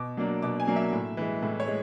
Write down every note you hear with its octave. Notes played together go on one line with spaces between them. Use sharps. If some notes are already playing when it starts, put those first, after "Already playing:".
Already playing: B2 D6
F#3 A#3 D4
B2 D6
G#5
F#3 A#3 D4
E5
A2
E3 G#3
A2
C#5
G#3